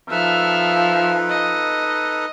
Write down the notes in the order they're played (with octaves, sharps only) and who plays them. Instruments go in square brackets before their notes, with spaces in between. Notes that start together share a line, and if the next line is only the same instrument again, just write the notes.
[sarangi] F3 [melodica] D#4 A4 B4 [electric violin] E5 F6
[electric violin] D#5